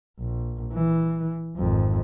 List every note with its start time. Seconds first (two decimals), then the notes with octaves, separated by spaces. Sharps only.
0.19 A#1
0.74 E3
1.57 G#1 F2